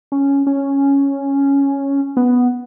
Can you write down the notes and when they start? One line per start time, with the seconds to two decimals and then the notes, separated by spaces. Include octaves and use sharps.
0.12 C#4
0.47 C#4
2.17 B3